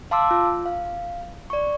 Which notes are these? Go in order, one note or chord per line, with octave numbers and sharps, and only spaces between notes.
F5 A5 C6 D6 E6
F4
F5
D5 C#6